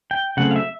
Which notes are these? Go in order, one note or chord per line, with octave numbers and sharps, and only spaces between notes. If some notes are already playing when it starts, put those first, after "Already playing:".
G5
C#3 F#3 A3 C4 F#5
F5
E5